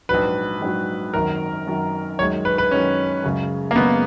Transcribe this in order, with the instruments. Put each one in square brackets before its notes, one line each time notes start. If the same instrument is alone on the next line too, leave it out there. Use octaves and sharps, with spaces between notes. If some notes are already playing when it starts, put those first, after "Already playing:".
[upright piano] A#1 G#2 F#3 [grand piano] B4
[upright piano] A#1 G#2 F#3
[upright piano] G#1 F#2 D#3 [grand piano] A#4
[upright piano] G#1 F#2 D#3
[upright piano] F#2 D#3 G#3 [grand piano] C#5
[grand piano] B4
B4
[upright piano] F#2 D#3 G#3 [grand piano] C#4
[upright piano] F#2 C#3 G#3
[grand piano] A#3
[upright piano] F#2 C#3 G#3 [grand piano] B3